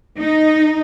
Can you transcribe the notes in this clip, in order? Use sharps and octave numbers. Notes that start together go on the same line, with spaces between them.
D#4